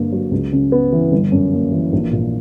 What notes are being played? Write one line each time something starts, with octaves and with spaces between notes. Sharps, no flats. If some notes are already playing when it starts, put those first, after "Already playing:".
Already playing: G1 G2 A#3
F#3
C#2
C#3
B3
E3
G1
F#2
A#3
E3
A#1
A#2